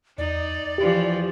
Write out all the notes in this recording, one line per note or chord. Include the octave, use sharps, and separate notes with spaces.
E2 D#4 D5
E3 F3 G4